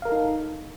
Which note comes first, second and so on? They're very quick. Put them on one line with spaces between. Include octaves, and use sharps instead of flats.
F5 A#4 A4 D#4